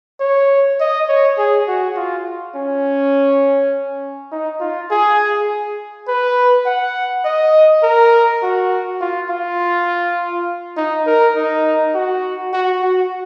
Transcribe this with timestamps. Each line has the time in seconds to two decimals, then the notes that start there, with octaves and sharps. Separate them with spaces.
0.20 C#5
0.80 D#5
1.08 C#5
1.38 G#4
1.68 F#4
1.96 F4
2.56 C#4
4.32 D#4
4.60 F4
4.91 G#4
6.08 B4
6.66 F#5
7.25 D#5
7.83 A#4
8.43 F#4
9.01 F4
9.30 F4
10.77 D#4
11.07 A#4
11.35 D#4
11.95 F#4
12.53 F#4
12.83 F#4